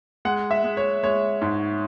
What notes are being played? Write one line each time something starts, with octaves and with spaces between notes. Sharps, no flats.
G#3 F#5
E5
G#3
C#5
G#3 C#5
G#2